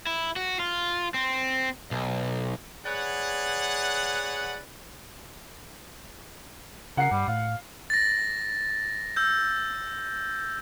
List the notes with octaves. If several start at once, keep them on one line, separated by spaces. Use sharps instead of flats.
E4
F#4
F4
C4
B1
G#4 B4 C#5 D5 F#5
C#3 A#4 F#5 C7
G2 G3
A2 F5
A6 A#6
E6 G6